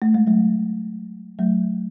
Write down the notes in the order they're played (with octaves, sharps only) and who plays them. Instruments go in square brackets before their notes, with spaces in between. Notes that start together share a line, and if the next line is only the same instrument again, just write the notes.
[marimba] A3
G#3
F#3 A3
F#3 A3